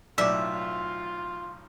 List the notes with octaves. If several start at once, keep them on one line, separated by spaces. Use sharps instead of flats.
B1 A2 F4 D5 E5 D6